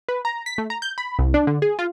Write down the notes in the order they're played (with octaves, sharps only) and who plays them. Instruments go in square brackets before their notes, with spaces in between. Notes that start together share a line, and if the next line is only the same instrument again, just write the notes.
[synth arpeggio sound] B4
A#5
B6
A3
A#5
G6
B5
C2
D4
D3
G#4
F4